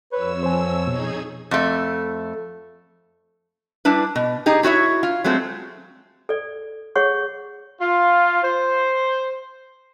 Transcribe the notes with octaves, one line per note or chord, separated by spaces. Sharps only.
F2 B4 C#5 E6
F3 C5 G#5
B2 D#4 G#4 G#6
F2 A3
G3 D4 E4 B4
B2
D#4 G4 G#4
E4 F#4 C#5 E5
F4
F#3 G#3 A3 C4
A4 D5
G#4 C#5 F#5 C#6
F4
C5